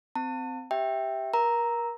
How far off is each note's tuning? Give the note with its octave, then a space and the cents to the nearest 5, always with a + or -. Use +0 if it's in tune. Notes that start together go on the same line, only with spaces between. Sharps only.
C4 -20 A5 +35
G4 +0 E5 +0 G5 +0
A#4 +30 A#5 +0